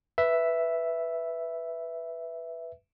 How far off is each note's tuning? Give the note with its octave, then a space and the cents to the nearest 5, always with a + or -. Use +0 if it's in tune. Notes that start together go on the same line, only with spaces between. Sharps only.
B4 +0 E5 +0